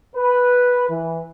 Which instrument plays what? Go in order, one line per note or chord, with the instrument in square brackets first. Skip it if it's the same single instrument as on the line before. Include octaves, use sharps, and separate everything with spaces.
[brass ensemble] B4
E3